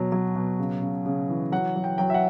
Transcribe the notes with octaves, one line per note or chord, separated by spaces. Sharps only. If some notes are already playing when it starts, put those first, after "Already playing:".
Already playing: B2 F#3
F#3
B2
C#3
C#3
C#3
E3
F#3 F#5
F#3
G5
F#3 G5
E5
F#5